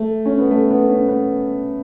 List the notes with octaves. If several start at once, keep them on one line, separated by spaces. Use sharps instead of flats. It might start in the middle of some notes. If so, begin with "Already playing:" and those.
Already playing: A3
C#4
B3
A3
B3
C#4
B3